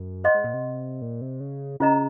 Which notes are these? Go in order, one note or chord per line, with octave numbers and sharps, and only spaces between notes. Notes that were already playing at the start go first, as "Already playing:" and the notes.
Already playing: F#2
C5 D#5 F#5 C6
G#2
A#2
C3
A#2
C3
C#3
C#3 C#4 F4 C5 D#5 A#5